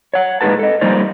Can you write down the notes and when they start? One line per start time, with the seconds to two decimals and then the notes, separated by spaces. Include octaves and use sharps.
0.14 C#5 F#5
0.41 A#2 G#3 D#4 A4 B4 A5
0.59 A4 D#5
0.81 F3 G3 A#3 D#4 C5 D5